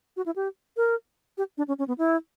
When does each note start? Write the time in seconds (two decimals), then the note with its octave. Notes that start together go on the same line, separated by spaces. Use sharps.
0.17 F#4
0.26 E4
0.36 G4
0.77 A#4
1.38 G4
1.58 D4
1.68 C#4
1.79 C#4
1.88 B3
1.98 E4